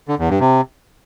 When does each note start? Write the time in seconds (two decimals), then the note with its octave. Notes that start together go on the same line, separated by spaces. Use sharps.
0.08 D3
0.19 E2
0.29 G2
0.40 C3